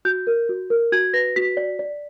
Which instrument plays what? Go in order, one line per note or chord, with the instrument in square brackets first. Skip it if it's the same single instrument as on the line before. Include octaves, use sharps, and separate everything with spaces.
[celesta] F#4 G6
A#4
F#4
A#4
F#4 G#6
B4 A#6
F#4 B6
D5
D5